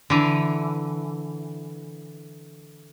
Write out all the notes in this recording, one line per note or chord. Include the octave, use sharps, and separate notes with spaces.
D3 E3